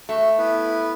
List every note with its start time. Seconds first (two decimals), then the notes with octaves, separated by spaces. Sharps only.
0.09 A3 F#4 E6
0.38 B3 E4 B4